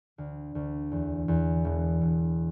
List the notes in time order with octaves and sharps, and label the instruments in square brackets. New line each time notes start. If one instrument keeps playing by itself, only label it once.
[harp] D2
D2
E2
E2
E1
E1